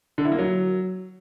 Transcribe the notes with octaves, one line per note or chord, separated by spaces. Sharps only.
D3
E4
A#3
F#3